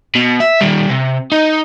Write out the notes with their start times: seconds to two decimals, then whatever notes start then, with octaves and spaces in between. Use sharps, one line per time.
0.15 B2
0.40 E5
0.61 D#3 G3
0.89 C3
1.32 D#4